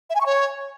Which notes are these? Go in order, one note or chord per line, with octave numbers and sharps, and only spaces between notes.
E5
G#5
C#6
C#5